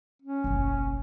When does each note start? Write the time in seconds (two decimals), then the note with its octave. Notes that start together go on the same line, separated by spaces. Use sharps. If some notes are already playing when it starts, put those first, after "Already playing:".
0.22 C#4
0.44 F#1 B1